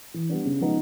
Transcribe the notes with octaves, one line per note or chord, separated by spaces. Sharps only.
E3
G3 B3 D4
C#3
F3 G#3 B3 D#4